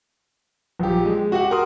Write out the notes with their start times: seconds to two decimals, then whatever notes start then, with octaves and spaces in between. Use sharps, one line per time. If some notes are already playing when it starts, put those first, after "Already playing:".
0.79 A#1 G4
1.05 G#3
1.32 F#4 G4 F#5
1.51 A#4 C6 D#6